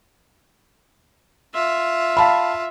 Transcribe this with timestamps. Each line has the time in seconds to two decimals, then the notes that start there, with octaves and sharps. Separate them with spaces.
1.54 F4 E5
2.17 F5 A5 B5